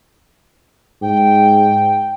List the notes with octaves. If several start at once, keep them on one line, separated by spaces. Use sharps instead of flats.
G#2 G5